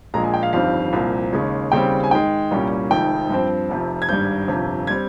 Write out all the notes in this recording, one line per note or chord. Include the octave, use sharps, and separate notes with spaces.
A#1 A#2 G#3 A#5
G#5
G5
F5
G1 F2 D#3 G3 C4 F5
C2 A#2 F3 C4
D#2 C#3 G#3 C#4
D#2 C#3 G3 C4 G5
G#5
G#2 D#3 G#3 G5
C2 A#2 G3 C#4
F1 F2 D#3 G#3 G5
G2 F3 C4
F1 F2 C3
G#6
G#1 G2 G3 G6
G1 F2 C3
G3 C4 G#6